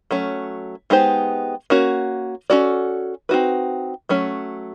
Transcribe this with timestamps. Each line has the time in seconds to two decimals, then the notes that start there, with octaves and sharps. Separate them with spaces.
0.11 F#3 A3 C#4
0.90 G#3 B3 D#4 G4 C5
1.70 A#3 C#4 F#4
2.50 C#4 F#4 A4 D5
3.29 C4 D#4 F#4 B4
4.09 F#3 A3 C#4